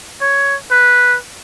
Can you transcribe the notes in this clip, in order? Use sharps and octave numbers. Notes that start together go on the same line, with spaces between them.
C#5
B4